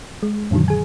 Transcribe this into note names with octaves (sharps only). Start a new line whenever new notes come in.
G#3
F#2 A#2 D3 D#3 F#3
G#4 G#5